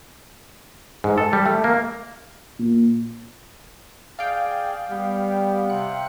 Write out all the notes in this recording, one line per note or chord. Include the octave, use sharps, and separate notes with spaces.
G#2
A4
G3
A3
A#3
A#2
G#4 D5 F5 G5
G3 B3 G4
C3 F#5 F#6